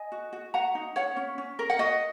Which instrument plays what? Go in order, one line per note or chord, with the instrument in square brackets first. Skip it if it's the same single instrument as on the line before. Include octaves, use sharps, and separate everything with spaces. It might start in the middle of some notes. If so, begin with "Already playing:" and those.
Already playing: [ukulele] D#5 G#5
F#4
F#4
F#4 F#5 A#5
D#4
C#4 C#5 F#5
C#4
C#4
A#4
F#5
F#4 D#5